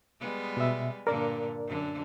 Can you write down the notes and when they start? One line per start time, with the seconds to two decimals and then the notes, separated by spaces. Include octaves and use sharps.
0.20 G3 G#3 B3
0.57 B2 E5
1.07 G2 A#2 D3 A#4 D5
1.66 F#2 D3